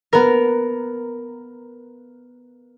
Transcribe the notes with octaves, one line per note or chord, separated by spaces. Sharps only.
B3 A#4